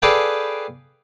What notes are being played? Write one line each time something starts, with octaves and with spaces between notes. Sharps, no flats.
G#4 A4 B4 D5 F5 G5